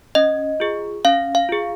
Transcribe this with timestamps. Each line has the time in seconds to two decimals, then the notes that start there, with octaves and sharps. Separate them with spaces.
0.15 C#4 D#5
0.60 F4 G#4
1.05 C#4 F5
1.35 F5
1.49 F4 G#4